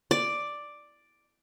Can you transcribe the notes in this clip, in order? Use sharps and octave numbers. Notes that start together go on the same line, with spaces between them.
D5